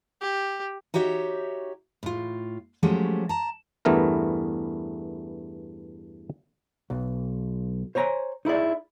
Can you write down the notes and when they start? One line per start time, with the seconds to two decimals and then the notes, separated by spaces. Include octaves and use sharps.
0.21 G4
0.94 D#4 F#4 G4 C#5 E5
2.03 A2 F4
2.83 F3 F#3 G#3 A3 C#4 G4
3.29 A5 A#5
3.85 E2 G2 E3 A3 B3 A#4
6.90 B1
7.95 C5 C#5 G#5 A#5
8.45 D#4 E4 G#4 D5